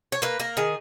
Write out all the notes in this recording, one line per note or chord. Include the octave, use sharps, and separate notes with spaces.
C#5
A#3 B4
A#3 A#4
D#3 G#4